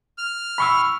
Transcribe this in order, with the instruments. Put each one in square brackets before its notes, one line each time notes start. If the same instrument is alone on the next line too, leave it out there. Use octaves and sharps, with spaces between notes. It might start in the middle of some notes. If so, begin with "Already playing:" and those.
[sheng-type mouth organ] F6
[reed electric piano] B5 C#6 E6